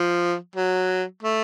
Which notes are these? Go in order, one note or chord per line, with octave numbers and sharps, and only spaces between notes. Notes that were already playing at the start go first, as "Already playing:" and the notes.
Already playing: F3
F#3
A3